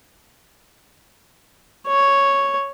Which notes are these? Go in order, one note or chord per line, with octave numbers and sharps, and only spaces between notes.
C#5